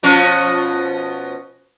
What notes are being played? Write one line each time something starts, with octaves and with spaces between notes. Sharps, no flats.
B2 F3 C#4